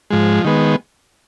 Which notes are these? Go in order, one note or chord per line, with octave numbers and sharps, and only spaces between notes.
G#2 F3 G#3
D#3 G#3 B3